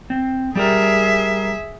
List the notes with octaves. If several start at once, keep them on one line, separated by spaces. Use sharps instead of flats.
C4
G3 G4 G#4 A#4 E5